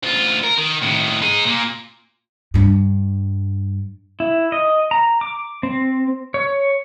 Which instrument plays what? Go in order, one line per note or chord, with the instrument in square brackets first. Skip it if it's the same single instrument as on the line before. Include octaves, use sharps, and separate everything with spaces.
[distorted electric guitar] D2 F4
A#4
D#3
A2 D#3
D#4 G#4
A#2 A#3
[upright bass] G2 D4
[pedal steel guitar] E4
D#5
A#5
D6
C4
C#5